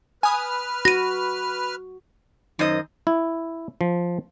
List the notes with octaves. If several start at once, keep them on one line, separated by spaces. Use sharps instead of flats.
B4 G#5 D#6 F6
F#4 A#6 D#7
F#2 D#3 C5 D#5
E4
F3